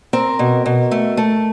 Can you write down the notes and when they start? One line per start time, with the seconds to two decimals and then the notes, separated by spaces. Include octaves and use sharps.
0.13 C4 A#4
0.39 B2
0.66 B2
0.91 A3
1.17 A3